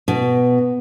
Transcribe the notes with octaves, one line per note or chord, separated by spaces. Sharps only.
B2